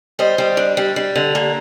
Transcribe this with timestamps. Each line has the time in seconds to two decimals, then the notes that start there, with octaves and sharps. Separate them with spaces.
0.19 G3 C5 D#5
0.38 G3
0.57 D4
0.77 G3
0.96 G3
1.16 D3
1.35 A#3